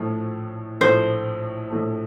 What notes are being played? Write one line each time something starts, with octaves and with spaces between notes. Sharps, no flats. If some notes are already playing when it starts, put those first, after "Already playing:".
Already playing: A#1 A2 F3 A3
A#1 A2 F3 A3 C5
A#1 A2 F3 A3